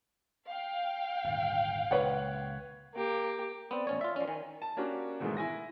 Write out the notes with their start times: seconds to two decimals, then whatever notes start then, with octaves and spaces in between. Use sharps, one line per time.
0.48 F5 G5
1.24 D#1 G#1 D3
1.91 C#2 A#2 B4 C#5 F#5
2.95 A#3 G4
3.71 B3 C4 D5
3.87 A1 C#4 C#5
4.01 F4 E5
4.16 F3 C#4 D5
4.28 D#3 G#5
4.62 A5
4.77 A#3 C#4 D4 F#4 G4
5.20 G#2 B2 D#3 E3 G#3 A3
5.37 E4 G#5 A#6